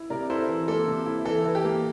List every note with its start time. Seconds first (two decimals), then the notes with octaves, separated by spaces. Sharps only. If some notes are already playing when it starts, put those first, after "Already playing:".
Already playing: E4
0.10 C3 A#4 D5
0.30 E4 A4 C5
0.49 E3
0.68 A#3 A4
0.87 C3
1.06 E4
1.25 E3 A4
1.45 E3
1.55 G4
1.64 A#3